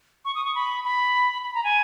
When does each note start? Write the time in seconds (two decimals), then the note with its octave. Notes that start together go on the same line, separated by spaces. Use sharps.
0.25 C#6
0.35 D#6
0.45 C#6
0.55 B5
0.84 B5
1.44 B5
1.55 A#5
1.64 G#5